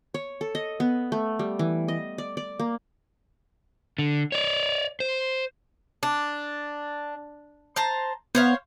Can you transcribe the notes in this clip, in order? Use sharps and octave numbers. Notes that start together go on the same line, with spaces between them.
C#5
A4
D#5
B3
A3
G3
E3
D#5
D5
D5
A#3
D3
C#5 D5
C5
D4
C5 A5 A#5
B3 C5 C#5 F5